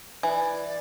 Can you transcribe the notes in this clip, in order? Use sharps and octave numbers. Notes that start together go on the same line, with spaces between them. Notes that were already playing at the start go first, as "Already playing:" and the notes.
E3 E5
D5